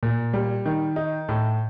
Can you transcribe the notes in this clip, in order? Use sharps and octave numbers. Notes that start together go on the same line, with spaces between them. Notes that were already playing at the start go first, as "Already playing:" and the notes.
A#2
G3
D#3
D#4
A2